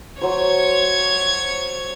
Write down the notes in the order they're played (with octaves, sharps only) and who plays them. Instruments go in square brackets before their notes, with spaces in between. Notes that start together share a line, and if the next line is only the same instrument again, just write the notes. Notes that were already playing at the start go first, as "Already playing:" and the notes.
[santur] F#3 C5 [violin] C#5 G#6